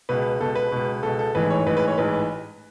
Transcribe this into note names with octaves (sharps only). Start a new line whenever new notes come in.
C#2 B2 B4
C#2 B2 A4
B4
C#2 B2
C#2 B2 A4
A4
A1 G#2 E3 B4
C#5
A1 G#2 E3 B4
B4
C#5
A1 G#2 E3 B4